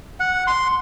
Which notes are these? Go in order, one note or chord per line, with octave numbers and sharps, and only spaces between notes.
F#5
C6